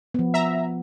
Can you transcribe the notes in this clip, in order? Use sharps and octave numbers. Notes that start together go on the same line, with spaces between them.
F3 B3
E5 A#5